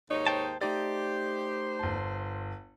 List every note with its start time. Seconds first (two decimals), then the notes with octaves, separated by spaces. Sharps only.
0.10 D#2 G#2 D#4 C#5
0.27 C5 G5 A5
0.61 A3 D#4 G4 C5 D5
1.79 G1 A5